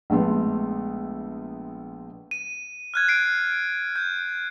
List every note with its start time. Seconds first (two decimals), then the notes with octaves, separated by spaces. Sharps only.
0.10 A#1 G#3 A3 B3 C6
2.31 D#7
2.94 F6 F#6 G#6
3.08 C7 D7
3.96 G6